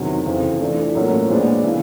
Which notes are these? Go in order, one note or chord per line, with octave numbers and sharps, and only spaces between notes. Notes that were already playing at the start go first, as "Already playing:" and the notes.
Already playing: E2 C3 D#3 F#3
F2 C#3 E3
E3 A3 D4 F4
A2 F#3 A#3 C#4 F4
A#2 F3 G#3 B3 D4
C#3 E3